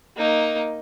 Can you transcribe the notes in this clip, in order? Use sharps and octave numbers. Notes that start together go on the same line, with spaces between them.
A#3 D#4